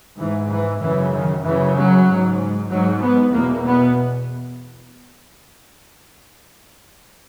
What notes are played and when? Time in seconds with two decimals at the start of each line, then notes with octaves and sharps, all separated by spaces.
0.18 G#2 E3
0.49 E3
0.81 F#2 C#3 E3
1.13 D#3
1.44 F#2 C#3 E3
1.76 F#3
2.07 G#2
2.69 G#2 F#3
3.01 B3
3.32 E2 B2 A#3
3.65 B3